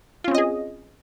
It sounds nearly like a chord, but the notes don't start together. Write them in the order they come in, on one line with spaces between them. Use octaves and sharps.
F4 C#4 C4 D#5 G#4